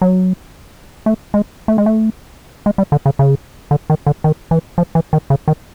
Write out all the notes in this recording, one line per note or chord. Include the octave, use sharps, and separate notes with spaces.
F#3
A3
G#3
A3
G#3
A3
G#3
G3
D3
C#3
C#3
D3
D#3
D3
D#3
E3
F3
E3
D#3
C#3
D#3